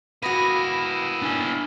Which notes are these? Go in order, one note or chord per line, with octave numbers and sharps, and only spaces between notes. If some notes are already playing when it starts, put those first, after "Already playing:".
A#3 E4 F#4 B4 D#6 A#6 D#7
D4 G#5